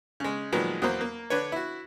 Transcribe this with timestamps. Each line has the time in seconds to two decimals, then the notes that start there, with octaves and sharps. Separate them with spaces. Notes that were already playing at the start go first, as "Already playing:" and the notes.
0.20 C#3 G#3
0.52 A#2 D#3 F3 F#3 G#3 B3
0.82 E2 F#3 A#3 C5
1.01 A#3
1.30 D3 D4 B4 C#5
1.52 E4 F#4